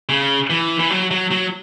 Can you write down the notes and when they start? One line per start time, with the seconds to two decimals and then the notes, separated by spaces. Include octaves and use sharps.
0.09 C#3
0.50 E3
0.79 E3
0.90 F#3
1.11 F#3
1.31 F#3